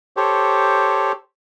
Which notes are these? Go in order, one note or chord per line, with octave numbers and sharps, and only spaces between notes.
G4 A4 C5 C#5